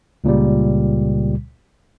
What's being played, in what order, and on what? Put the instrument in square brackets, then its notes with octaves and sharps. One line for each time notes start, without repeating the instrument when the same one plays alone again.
[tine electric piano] C#2 A#2 C#3 G3